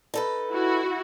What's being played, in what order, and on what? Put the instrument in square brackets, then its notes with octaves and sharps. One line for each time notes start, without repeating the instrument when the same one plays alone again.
[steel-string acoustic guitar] D#4 A4 B4
[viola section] E4 F#4